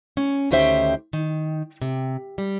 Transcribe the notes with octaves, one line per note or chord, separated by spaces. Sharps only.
C#4
D2 D#3 C#4 G4 C5 E5
D#3
C3
G3